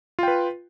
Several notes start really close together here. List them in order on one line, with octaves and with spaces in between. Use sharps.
F4 G5 B4